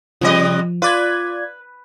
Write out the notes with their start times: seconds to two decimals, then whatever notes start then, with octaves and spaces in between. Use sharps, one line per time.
0.21 C3 F3 G3 D#5
0.82 F4 B4 D5 G#6